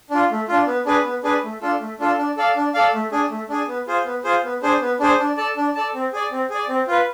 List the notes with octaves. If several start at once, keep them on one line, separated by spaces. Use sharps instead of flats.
D4 F4
A3
D4 F4
B3
D4 G#4 B4
B3
D4 G#4 B4
A3
D4 F4 A4
A3
D4 F4 A4
D4
A4 D5 F5
D4
A4 D5 F5
A3
D4 G#4
A3
D4 G#4
B3
F4 G#4 C5
B3
F4 G#4 C5
B3
D4 G#4 C5
B3
D4 G#4 C5
D4
A4 D5 A5
D4
A4 D5 A5
C4
G#4 D5
C4
G#4 D5
C4
F4 B4